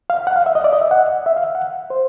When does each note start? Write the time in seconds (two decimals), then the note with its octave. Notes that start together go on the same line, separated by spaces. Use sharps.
0.10 F5
0.27 F#5
0.36 F5
0.46 E5
0.55 D#5
0.64 D5
0.73 D#5
0.81 E5
0.91 F#5
1.26 E5
1.36 F5
1.55 F#5
1.90 C5